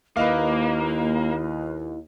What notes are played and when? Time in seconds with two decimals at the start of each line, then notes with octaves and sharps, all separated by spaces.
0.17 D#2 A#3 E4 B4 D#5 F5